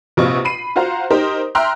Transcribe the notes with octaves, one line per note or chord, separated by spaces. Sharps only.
A#1 C3 F4 B4 D#5 C#6
B5 C7 D#7
F4 F#4 C5 F5 F#5 A#5
D#4 G4 A#4 C5
E5 G5 A#5 C6 F6 F#6